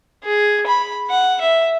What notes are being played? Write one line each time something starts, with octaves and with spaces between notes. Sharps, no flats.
G#4
B5
F#5
E5